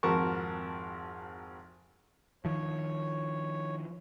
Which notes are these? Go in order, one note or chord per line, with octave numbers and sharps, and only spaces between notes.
G#1 F2 F#4 A#4 A5 C#6
D#3 F3 C#5